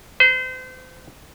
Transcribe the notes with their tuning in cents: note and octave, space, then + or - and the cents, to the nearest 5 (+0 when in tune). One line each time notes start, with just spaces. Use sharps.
C5 -35